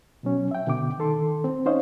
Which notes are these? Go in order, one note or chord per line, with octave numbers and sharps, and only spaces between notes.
B2 F#3 C#4
E5 G5
B2 D3 G5 D6
D#3 A4 C6
C4
C#4 D#4 C5 C#5 D#5 F5